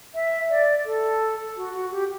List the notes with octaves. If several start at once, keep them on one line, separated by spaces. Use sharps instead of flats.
E5
D5
A4
F#4
F#4
G4